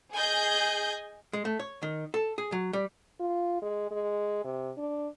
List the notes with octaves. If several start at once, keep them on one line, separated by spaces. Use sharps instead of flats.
G#4 D#5 G#5 G6
G#3
A3
C#5
D#3
A4
G#4
F#3
G3
F4
G#3
G#3
C3
D4